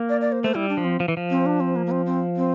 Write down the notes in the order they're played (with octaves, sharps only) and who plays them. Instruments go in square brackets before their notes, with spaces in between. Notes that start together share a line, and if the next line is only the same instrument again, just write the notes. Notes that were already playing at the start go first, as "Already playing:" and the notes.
Already playing: [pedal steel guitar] A#3
[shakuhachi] D5
D5
C5
[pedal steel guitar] A3 [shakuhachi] C5
[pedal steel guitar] G3 [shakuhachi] E4
[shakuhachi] D4
[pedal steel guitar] F3
[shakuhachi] C4
[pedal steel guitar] F3
E3
F3
[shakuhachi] C4
D4
C4
A#3
A#3
C4
C4
C4